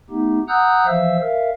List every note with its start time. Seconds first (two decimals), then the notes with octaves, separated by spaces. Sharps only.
0.10 A3 B3 D#4 G4
0.49 F#5 A#5 D#6 E6 F#6 G6
0.86 E3 F3 C5 E5 F5 E6
1.21 A#4 E5 F5